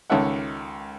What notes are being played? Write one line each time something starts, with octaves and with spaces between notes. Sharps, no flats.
C#2 D#3 C#4 A4 E5 F#5